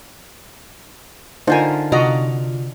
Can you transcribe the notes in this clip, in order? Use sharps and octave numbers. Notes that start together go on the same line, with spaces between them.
D3 D#4 F4 A#4 C5 G#5
C3 F4 F#4 D5 D#5 F5 A#5